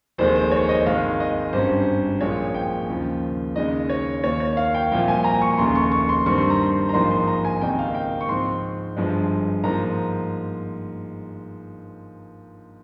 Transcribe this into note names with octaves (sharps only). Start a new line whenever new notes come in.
F1 D#2 D#3 G#3 C5
C5
C#5
D#5
G#1 G#2 D#3 G#3 F5
D#5
G#1 G2 G3 C#4 C5
A#1 A#2 F3 G#3 C#5
G5
D#2 C#3 F3
D#2 C#3 G#3 D#4 D#5
C#5
D#2 D#3 A#3 C#5
C#5
F5
G5
C2 A#2 F3 G5
G#5
A#5
C#6
F1 D#2 C#3 C6
C#6
C#6
C6
G2 D#3 G3 C4 C#6
C6
A#5
C6
A#5
A#1 G#2 F3 A#3 D#4 C6
C6
A#5
G#5
C#2 C3 D#3 A#3 D#4 G5
F5
G5
C#6
G#2 F3 C4 C6
G1 G2 F3 G#3
G#2 F3 A#3 A#5